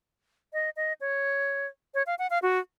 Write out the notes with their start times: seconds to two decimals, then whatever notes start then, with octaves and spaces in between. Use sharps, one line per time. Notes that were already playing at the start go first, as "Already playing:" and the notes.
0.53 D#5
0.76 D#5
1.01 C#5
1.94 C#5
2.07 F5
2.19 F#5
2.30 F5
2.42 F#4